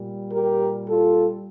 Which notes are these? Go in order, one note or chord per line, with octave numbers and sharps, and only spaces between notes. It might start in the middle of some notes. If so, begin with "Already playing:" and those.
Already playing: A#2 G3
G4 A#4
F4 A4